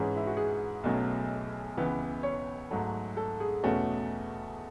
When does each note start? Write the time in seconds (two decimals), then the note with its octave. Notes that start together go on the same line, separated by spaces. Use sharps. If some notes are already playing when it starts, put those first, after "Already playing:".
Already playing: G#2 E3 G#3 C#4 G#4
0.16 E4
0.27 F#4
0.37 G#4
0.83 B1 B2 F#3 A3 C#4
1.77 C#2 C#3 E3 B3
2.23 C#5
2.71 G#2 F#3 A3
3.17 A4
3.40 G#4
3.63 E2 B2 A3 C#4 F#4